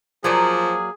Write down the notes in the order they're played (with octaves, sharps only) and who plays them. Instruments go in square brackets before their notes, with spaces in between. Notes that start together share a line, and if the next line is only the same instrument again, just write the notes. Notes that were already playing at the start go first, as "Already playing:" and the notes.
[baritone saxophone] F3 [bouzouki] F#3 A#3 D5 [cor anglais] G#4